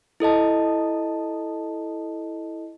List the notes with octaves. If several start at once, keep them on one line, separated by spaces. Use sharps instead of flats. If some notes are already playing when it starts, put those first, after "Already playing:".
E4 A4 D#5 A5